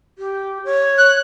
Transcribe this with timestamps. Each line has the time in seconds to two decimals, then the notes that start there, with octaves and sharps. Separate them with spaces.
0.18 G4
0.64 C#5
0.98 F#6